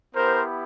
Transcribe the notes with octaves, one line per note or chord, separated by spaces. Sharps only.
B3 E4 G4 A#4 C5